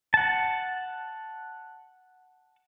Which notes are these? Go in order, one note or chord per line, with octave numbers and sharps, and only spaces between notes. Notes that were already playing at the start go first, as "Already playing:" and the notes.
F#5 A5